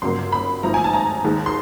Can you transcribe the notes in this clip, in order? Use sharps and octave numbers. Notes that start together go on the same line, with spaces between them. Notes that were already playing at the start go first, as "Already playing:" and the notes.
G1 F#2 C#3 F#3 A#3 C6
B5
G#1 G#2 F3 A3 A#5
G#5
A5
A#5
D#2 D#3 G#3
C6